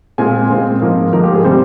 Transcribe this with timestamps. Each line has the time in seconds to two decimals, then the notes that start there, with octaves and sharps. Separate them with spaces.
0.18 A#2 G#3 C4 G#5
0.50 A#2 G#3 C4
0.81 G#2 F3 A#3 A#4
1.13 G#2 F3 A#3 A#4
1.23 G4
1.34 G#4
1.44 C3 G3 C4 C5